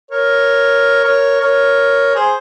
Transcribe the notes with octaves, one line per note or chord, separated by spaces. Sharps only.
A#4 C#5
A#4 C#5
A#4 C#5
G#4 C5